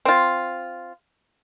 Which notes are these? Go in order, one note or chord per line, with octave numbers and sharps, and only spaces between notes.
C4 F4